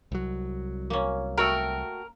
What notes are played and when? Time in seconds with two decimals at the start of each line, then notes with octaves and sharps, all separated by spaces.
0.12 C2 F#3
0.90 A#3 C#4
1.38 A3 F#4 A#4 G5